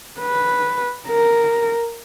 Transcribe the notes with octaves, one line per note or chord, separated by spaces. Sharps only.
B4
A#4